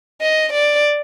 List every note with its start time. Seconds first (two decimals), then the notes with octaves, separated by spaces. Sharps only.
0.22 D#5
0.53 D5